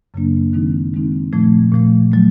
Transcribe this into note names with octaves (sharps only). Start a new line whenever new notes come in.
F#2 C#3 F#3 A#3 D4
D#3 G#3 C4 D#4
D#3 G#3 C4 D#4
A#2 F3 A3
A#2 F3 A3
F#3 A3